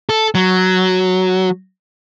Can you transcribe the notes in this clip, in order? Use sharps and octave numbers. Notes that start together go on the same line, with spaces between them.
A4
F#3